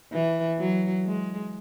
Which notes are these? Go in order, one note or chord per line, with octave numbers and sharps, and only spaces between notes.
E3
F#3
G#3